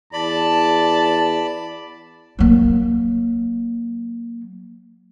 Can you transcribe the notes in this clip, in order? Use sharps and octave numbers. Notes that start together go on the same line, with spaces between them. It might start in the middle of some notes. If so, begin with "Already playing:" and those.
E2 D5 A5 B5
F#3 A#3